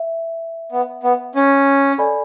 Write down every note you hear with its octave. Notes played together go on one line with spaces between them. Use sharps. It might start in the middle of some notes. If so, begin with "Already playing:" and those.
Already playing: E5
B3
B3
C#4
A4 D5 G#5 B5